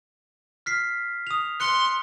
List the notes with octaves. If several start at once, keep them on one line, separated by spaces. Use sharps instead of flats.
F6 B6 C7
D#6 F7
C6 F#6 C#7 G7